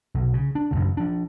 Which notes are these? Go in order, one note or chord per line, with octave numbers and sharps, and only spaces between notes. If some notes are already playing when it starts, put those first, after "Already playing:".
B1 B2
C#3
D4
A1 F#2 A2 C#3
F3 D4